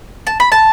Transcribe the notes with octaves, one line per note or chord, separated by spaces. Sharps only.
A5
B5
A5